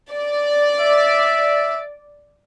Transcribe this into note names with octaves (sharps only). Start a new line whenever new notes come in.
D5
E5